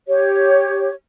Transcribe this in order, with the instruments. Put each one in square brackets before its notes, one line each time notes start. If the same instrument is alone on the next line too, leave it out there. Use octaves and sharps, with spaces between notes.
[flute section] G4 C#5